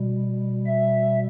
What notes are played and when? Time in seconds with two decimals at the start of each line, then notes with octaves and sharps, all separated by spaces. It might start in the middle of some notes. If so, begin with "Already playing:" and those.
Already playing: B2 G3
0.66 E5